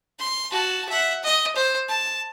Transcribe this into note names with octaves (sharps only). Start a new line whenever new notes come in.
C6
F#4 A5
E5 F#5
D#5
C5
A5